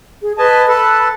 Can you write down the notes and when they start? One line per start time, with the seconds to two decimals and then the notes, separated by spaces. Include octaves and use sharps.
0.22 G#4
0.38 B4 D#5 G#5 A5
0.68 A4 B4 A5 B5